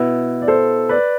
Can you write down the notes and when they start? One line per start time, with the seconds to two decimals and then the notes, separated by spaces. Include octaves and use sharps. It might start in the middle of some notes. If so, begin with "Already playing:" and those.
Already playing: B2 B3 E4
0.42 D5
0.48 A4 C5
0.89 B4 D5